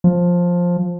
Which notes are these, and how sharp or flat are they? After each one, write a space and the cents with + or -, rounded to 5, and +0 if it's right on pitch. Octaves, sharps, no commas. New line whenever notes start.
F3 +10